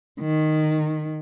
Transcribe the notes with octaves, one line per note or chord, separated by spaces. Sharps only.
D#3